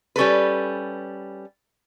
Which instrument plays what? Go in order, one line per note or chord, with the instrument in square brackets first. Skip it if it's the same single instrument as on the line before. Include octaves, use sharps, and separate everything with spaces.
[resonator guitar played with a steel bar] G3 C#4 A4 B4